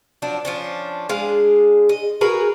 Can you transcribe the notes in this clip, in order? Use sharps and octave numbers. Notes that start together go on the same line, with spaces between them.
F3 F#3 D4
F3 C#4 D4
G#3 D4 G#4 F5
D#5
F#4 G#4 A#4 B4